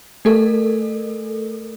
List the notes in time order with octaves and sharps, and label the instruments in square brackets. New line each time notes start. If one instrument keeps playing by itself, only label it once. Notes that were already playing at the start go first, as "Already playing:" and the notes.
[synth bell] A3 A4 A#4